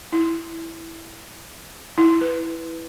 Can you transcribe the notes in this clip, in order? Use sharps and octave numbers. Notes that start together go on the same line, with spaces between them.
E4
E4
B4